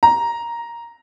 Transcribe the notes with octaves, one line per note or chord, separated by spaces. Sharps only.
A#5